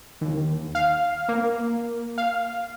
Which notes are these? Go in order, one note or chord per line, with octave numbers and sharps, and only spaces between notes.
D#2
F5
A#3
F5